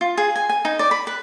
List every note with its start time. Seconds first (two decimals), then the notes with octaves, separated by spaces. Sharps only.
0.01 F4
0.18 G#4
0.36 G#5
0.49 G#5
0.65 D#4
0.79 D5
0.91 B5
1.07 B4